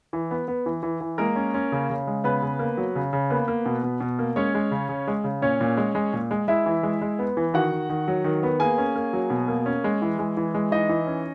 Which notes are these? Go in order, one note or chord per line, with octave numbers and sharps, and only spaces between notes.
E3
B3
B3
E3
E3
E3
G#3 A#3 A#4
C#4
C#4
C#3
C#3
G#3
C#3 B3 B4
C#3
A#3
F#3
C#3
C#3
A#3 B3 B4
A#3
B2
B2
B2
A#3
G#3 C#4 C#5
G#3
C#3
C#3
G#3
C#3
A#2 C#4 C#5
A#2
G#3
G#3
A#2
G#3
G#3 E4 E5
E3
G#3
G#3
B3
E3
D#3 F#4 F#5
D#3
D#3
F#3
D#3
B3
A#3 G#4 G#5
C#4
A#3
F#3
B2
A#3
C#4
G#3
E3
G#3
E3
G#3
E3 D#4 D#5
E3
C#4